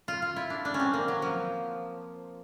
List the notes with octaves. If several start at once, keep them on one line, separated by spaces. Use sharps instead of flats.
F4
F4
E4
D4
D4
C#4
C4
A#3
F#3
F3